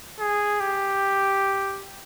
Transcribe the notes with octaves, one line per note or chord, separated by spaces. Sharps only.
G#4
G4